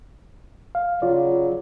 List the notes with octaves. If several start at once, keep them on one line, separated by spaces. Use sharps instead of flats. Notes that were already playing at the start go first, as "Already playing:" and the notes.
F5
C#3 F#3 F4 D5